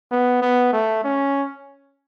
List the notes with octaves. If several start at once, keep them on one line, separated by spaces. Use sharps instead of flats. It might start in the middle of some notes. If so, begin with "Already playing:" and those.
B3
B3
A3
C#4